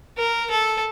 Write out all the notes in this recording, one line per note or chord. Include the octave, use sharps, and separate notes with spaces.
A#4
A4